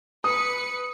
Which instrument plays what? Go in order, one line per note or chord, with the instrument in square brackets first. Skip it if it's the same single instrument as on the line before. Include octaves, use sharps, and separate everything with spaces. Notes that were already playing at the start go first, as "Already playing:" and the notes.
[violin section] B4 C#7 [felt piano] D#6